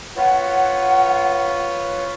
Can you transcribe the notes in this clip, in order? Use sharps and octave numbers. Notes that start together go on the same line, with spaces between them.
F4 B4 C#5 F#5